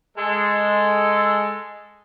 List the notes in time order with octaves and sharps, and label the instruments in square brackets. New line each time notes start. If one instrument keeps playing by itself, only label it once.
[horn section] G#3 A4